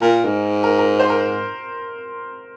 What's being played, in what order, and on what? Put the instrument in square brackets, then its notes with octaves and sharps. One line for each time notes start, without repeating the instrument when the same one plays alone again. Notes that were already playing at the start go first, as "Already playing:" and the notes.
[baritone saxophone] A#2 [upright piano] A#4
[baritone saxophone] G#2
[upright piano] A#4
A#4
C5
A#4